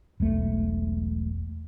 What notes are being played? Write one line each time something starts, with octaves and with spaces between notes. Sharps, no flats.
E1 B1 A3